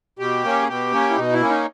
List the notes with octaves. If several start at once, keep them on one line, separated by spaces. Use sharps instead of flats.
B2 G4
A#3 C#4
G#4
B2 G4
A#3 C#4
E4
B2 D#4
E4
A#3 C#4
D#4